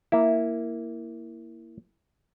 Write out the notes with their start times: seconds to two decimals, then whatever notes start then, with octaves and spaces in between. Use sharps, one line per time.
0.12 A#3 E4